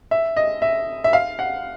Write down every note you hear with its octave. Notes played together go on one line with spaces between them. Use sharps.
E5
D#5
E5
E5
F5
F#5